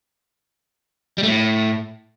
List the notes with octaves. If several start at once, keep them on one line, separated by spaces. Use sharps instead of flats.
G3
A3
A2